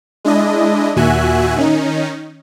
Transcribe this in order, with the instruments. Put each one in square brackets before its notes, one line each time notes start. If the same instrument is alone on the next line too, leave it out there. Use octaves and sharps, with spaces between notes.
[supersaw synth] G#3 D4 E4 D#5
D#2 A#2 F#4 E5 G#5 F#6
D#3 C#4 D#4